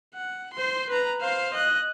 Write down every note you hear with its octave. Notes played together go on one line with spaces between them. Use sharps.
F#5
C5 C6
B4 A#5
C5 F5
D#5 F#6